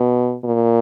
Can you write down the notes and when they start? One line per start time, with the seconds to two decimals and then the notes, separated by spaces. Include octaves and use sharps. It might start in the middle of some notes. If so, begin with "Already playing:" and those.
Already playing: B2
0.44 A#2